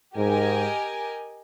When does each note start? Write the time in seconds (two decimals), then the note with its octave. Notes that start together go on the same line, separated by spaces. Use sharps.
0.16 G#2 G4 A#4 D#5 G#5